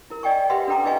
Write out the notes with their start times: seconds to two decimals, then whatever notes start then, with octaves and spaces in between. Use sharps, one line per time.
0.10 E4 A#4
0.23 D5 D#5 G5 G#5 C#6
0.50 G4 B4 E5 F#5 C6
0.68 D4 A4 B4 G5 A#5 D6
0.85 E4 B4 D#5 F5 G#5 C#6